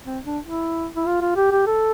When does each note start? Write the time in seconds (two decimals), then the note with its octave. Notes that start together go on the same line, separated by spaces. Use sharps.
0.05 C4
0.25 D4
0.45 E4
0.96 E4
1.06 F4
1.21 F4
1.36 G4
1.51 G4
1.67 A4